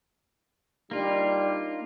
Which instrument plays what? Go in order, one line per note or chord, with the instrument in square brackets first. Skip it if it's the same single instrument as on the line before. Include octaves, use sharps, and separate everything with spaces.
[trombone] G3 [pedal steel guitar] A#3 F4 [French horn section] D4 D#4